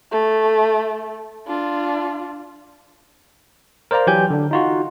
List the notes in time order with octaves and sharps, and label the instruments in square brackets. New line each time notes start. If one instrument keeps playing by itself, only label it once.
[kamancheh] A3
D4 F4
[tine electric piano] A#4 C5 D5 F5 A#5
E3 F#3 G4 G5 G#5 G6
D3 D4
D#4 F4 F#4